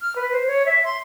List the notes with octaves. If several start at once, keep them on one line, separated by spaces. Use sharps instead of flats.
F6
B4
C5
C#5
E5
C6